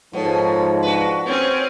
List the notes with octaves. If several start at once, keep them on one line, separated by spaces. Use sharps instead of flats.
G#2 B2 F3 A4 C#5 D5
D4 F#4 B4
C4 C#4 C#5